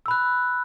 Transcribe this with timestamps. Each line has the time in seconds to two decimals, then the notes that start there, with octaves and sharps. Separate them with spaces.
0.06 E6
0.08 B5
0.11 F#6